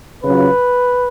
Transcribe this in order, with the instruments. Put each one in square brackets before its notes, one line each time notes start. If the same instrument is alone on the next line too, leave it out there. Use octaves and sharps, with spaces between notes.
[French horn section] C#3 F#3 C#4 F4 [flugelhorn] B4